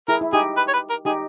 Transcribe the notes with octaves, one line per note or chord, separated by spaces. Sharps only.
E4 G#4 A#4
E4
D#4 G4 G#4
B4
C#5
B4
A#4
D#4 G4 G#4